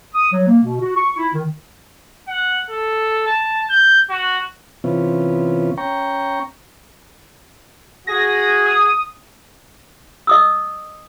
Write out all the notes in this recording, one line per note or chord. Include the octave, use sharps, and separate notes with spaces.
D#6
F#3
A#3
B2
F#4
C#6
E4
D#3
F#5
A4
A5
G6
F#4
C3 E3 B3 C#4 F4
C#4 G5 A#5 C#6
F#4 G#4 A#6
D#6
D#5 D#6 E6